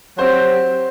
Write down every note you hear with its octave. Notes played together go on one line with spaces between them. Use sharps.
F#3 C4 G4 C5